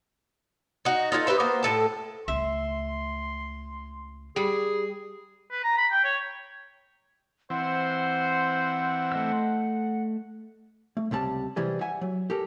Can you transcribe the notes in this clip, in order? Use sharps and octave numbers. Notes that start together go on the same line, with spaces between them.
D#4 F#4
D#4 F4 G#4 A4
G4 B4 C5 E5
A#3 B3 C5
A2 A4 A5
C#2 A3 E5 C6
G3 G#4
B4
A#5
B5
G5
C#5
E3 C4 C5 F#5
A3 D#5 E6
A3
C#2 C3 G3 A5
C3 E3 G3 G#4
E5 F#5 G#5
F#3
G4 A4 A#4